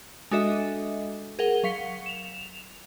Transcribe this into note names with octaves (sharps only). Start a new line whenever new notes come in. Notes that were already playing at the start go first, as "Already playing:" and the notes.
G#3 D4 F#4 A4 D#5 E5
G#4 A#4 F#5 G7
F#3 F5 B6 C#7
E7 F7